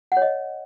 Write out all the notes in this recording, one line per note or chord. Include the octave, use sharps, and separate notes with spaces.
F#5
C#5
D#5